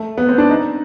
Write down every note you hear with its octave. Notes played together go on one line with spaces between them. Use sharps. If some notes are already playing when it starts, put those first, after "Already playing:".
Already playing: A3
B3
C4
D4
D#4